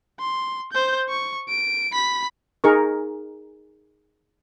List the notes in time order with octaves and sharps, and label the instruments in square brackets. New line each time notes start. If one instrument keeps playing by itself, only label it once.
[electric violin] C6
C5 G6
C#6
D7
B5 B6
[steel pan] D#4 G#4 A#4 C#6